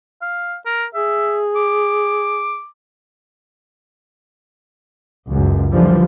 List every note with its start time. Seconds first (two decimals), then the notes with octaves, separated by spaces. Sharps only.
0.22 F5
0.66 A#4
0.95 G#4 E5
1.56 D6
5.28 C#2 F#2
5.72 F#2 D3 E3 F3 G3